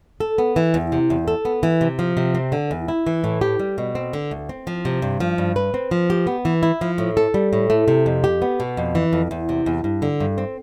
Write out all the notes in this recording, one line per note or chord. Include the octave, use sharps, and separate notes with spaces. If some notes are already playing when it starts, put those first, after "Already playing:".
A4
B3
E3
E2
C3
E2
A4
B3
E3
C3
F3
C3
C4
D3
E2
E4
E3
A2
G4
G3
B2
C4
D3
D2
C4
F3
C3
G2
F3
G2
B4
C4
F3
G4
B3
E3
E4
F3
A2
A4
G3
A2
A3
C3
F2
G4
B3
B2
F2
E3
F2
E2
C3
E2
G2
D3
G2
C4